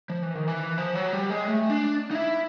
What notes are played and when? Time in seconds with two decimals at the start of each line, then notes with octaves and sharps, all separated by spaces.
0.10 F3
0.23 E3
0.36 D#3
0.48 E3
0.78 F3
0.95 F#3
1.13 G3
1.30 G#3
1.48 A3
1.70 D4
2.11 D#4
2.15 E4